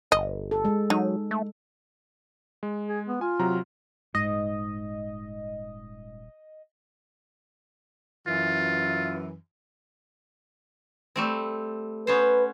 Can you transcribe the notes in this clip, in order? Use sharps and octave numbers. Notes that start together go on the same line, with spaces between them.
G1 D#5
A4
G#3
F#3 D#4
A3
G#3
G#4
B3
F4 G#5
C3 F#3 A#5
D#1 G#2 D#5
F#2 E3 F4
G3 A3 C4
B3 C#4 B4 C5